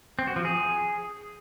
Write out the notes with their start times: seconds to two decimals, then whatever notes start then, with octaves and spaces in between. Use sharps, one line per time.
0.19 C4
0.27 F#4
0.36 F3
0.45 G#4